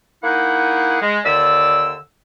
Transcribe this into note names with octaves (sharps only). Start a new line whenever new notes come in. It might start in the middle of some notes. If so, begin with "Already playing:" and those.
A#3 D#4 E4 G#4 F#5
G#3
D#2 D3 D5 E6